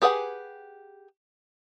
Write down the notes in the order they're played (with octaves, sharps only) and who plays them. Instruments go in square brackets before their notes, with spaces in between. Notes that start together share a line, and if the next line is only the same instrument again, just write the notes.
[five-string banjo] G4 G#4 B4 F#5 G#5